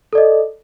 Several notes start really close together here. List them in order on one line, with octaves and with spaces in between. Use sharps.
A4 D5 D#5